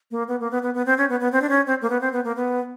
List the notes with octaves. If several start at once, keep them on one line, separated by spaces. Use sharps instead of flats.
A#3
B3
A#3
B3
B3
B3
C4
C#4
B3
B3
C4
D4
C#4
C4
A#3
B3
C4
B3
A#3
B3